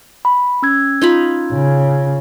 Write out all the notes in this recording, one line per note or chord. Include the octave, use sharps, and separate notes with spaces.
B5
C#4 E6 G#6
D#4 F4 B5
C#3